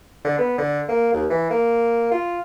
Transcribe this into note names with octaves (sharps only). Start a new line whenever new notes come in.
D3
B3
D3
A#3
D#2
E3
A#3
F4